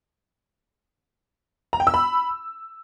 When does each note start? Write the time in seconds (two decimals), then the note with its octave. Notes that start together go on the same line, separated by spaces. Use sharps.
1.73 A#5
1.80 G5
1.87 E6
1.94 B5